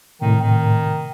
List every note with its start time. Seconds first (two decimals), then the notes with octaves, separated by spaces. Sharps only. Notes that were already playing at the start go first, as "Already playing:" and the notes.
0.21 A2 C3 D#3
0.41 D#3